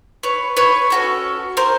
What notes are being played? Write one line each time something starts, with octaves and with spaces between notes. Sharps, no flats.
B4 C#5
B4 C#5
C#4 F#4 A4
A#4 C5